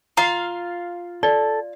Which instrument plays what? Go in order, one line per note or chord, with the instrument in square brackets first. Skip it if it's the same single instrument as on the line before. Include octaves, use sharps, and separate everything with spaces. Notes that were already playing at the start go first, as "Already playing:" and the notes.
[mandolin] F4 F5 [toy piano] A#5
[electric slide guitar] A4 [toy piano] D5